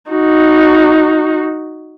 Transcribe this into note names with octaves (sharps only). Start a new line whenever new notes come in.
D#4 F#4